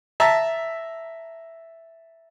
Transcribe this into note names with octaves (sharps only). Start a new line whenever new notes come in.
E5 A5 A#5